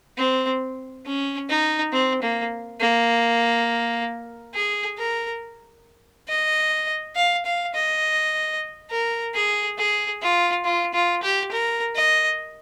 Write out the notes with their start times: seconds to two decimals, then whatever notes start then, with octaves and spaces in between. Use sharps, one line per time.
0.18 C4
1.06 C#4
1.50 D#4
1.92 C4
2.22 A#3
2.80 A#3
4.55 G#4
4.98 A#4
6.29 D#5
7.16 F5
7.46 F5
7.74 D#5
8.90 A#4
9.34 G#4
9.78 G#4
10.22 F4
10.64 F4
10.94 F4
11.23 G4
11.52 A#4
11.96 D#5